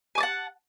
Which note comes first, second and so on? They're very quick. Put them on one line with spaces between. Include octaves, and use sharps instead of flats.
G#5 D6 A5 F#5